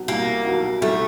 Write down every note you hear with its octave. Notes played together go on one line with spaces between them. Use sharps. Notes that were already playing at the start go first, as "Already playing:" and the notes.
Already playing: B2 F#3
C2 A#3
B2 F#3
C2 A3